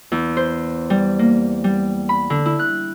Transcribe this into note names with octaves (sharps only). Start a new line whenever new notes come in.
E2
C5
G3
A#3
G3
B5
D3
E4
F#6